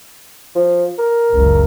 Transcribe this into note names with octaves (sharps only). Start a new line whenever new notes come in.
F3
A#4
F#1 C#2